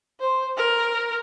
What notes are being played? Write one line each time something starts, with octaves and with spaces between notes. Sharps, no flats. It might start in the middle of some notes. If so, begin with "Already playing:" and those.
C5
A#4